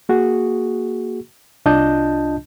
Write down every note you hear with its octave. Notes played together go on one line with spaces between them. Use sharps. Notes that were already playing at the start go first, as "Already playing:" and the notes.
A#3 F#4 G#4
C2 D4 F4 D#5 A5 G6